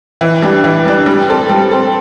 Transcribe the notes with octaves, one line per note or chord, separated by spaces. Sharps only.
E3
G3 D4
E3
G3 D4
G3
C4 A4
G3
C4 A4